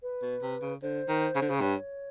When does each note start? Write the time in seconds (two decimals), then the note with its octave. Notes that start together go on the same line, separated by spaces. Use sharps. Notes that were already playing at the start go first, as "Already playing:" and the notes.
0.03 B4
0.22 B2
0.42 C3
0.61 C#3
0.82 D3 C5
1.08 D#3
1.35 C#3
1.42 D3
1.50 C#3
1.61 G2 C#5